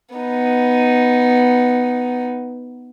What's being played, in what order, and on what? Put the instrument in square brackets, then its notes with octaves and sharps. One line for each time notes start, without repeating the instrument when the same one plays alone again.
[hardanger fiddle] B3 D#4